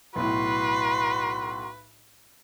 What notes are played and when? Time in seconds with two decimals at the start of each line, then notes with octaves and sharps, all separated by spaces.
0.16 B1 A2 F#4 B4 B5 C6